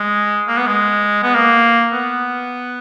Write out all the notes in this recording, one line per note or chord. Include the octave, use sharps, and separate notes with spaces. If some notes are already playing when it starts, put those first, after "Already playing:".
Already playing: G#3
A#3
B3
G#3
B3
A#3
B3